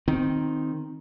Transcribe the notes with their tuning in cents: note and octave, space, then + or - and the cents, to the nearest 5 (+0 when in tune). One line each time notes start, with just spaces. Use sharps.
D#3 +0 C4 +0